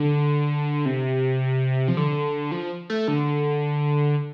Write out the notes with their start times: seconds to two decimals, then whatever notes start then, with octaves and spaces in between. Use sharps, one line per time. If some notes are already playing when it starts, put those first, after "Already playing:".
Already playing: D3
0.85 C3
1.88 F3
1.97 D3
2.52 F3
2.90 A3
3.08 D3